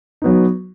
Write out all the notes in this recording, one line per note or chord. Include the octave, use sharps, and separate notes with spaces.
F#3 B3 D#4